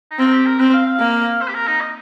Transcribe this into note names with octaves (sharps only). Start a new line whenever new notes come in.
D#4
C4 F4
A#4
G4
A#4
C4 C5
F5
F5
A#3
C5
G4
A#4
D#4
D#5